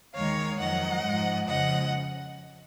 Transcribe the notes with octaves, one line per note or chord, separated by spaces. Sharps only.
D#2 D#3 G#3 C#5 F5
F2 D#3 F#3 D#5 F#5
G#2 F3 G#3
F2 C#3 F3 D#5 F#5